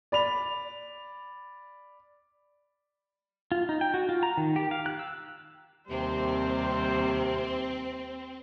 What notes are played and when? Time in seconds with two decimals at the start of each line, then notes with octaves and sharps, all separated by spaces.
0.12 D5 B5 F7
3.52 F4
3.69 D#4
3.81 G5
3.94 F#4
4.09 F4
4.23 A#5
4.37 D#3
4.56 G4
4.71 F5
4.86 F#6
4.99 E6
5.90 D#2 C3 G3 C4 C5